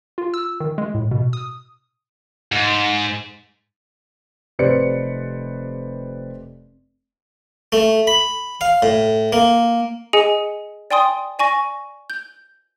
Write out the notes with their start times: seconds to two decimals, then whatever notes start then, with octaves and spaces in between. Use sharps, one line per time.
0.18 F4
0.34 E6
0.60 D#3
0.78 G#3
0.94 A2
1.11 B2
1.33 D#6
2.52 G#2
4.59 F1 C3 B4 C5 D5 C#7
7.72 A3
8.07 B5
8.61 F5
8.82 A2
9.33 A#3
10.13 G#4 D#5 G#5 C#7 D#7
10.91 D5 G5 G#5 C6 D#6
11.39 D5 G#5 C#6 A#6
12.10 G6